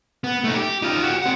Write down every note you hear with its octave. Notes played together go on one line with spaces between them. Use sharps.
B3
A3 D#4
G4
D#4 F4
F#4 G4
C4 F#5